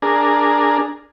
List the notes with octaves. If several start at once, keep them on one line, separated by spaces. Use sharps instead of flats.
D4 G#4 A#4